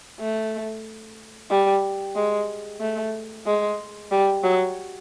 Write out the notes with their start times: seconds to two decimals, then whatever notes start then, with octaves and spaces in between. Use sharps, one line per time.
0.20 A3
1.50 G3
2.15 G#3
2.80 A3
3.46 G#3
4.11 G3
4.44 F#3